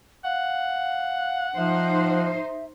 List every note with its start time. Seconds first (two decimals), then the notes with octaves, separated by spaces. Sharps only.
0.25 F5 F#5
1.57 F3 D#4 C5 E5